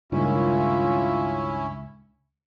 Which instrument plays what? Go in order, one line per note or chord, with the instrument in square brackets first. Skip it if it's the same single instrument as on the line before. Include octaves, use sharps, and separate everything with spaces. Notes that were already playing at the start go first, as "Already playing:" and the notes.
[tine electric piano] C#2 [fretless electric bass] G2 A#2 D#3 [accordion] C#4 E4 [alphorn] F4